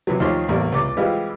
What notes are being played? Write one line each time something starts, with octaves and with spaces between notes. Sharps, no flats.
C3 E3 F#3
D#2 D#3 F3 G4 C#5 C6
A1 E2 G3 A#3
C#2 C3 D6
E3 G3 G#3 C4 F4 G4